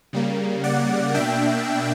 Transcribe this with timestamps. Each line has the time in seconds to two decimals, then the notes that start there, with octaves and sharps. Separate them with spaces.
0.13 C#3 G3 A#3
0.64 D5 F#5
1.14 B2 A#3 D4 E5 G5